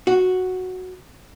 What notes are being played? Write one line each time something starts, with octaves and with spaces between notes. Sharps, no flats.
F#4